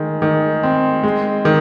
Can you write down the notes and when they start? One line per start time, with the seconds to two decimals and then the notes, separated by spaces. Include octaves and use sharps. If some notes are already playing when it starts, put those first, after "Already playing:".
Already playing: D#3 G#3
0.22 D#3
0.63 C4
1.03 G#3
1.45 D#3